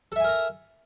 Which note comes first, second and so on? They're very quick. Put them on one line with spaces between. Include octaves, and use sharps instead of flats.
A4 E5 G#5 A#4 A#5